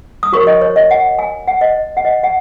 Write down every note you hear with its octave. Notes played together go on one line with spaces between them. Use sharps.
D#6
F#4 A#4 C#5 C#6
D#5
C#5
D#5
F#5
G#5
F#5
D#5
F#5
D#5
F#5